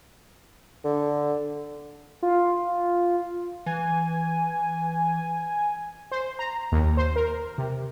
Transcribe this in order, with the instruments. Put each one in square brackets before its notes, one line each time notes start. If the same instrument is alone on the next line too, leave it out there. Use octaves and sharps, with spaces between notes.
[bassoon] D3
[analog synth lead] F4
[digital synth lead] E3 [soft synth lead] G#5
[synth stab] C5
A#5
D#2
C5
A#4
C3